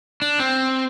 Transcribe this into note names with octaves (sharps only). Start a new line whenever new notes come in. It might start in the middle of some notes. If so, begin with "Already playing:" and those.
D4
C4